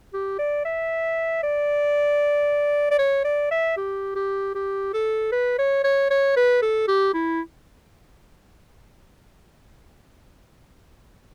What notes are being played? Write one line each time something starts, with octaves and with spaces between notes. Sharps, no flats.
G4
D5
E5
D5
D5
C#5
D5
E5
G4
G4
G4
A4
B4
C#5
C#5
C#5
B4
A4
G4
E4